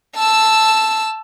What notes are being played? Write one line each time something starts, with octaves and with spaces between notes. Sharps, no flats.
A5 E6